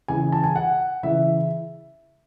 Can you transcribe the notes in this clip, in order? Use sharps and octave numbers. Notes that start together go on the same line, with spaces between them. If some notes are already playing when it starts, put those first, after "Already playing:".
C#3 E3 G#5
A5
G#5
F#5
C#3 E3 E5